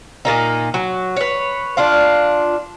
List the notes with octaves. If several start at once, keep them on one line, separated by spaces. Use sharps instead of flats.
A#2 A#3 D#4
F#3
B4 C#5
D4 F4 F5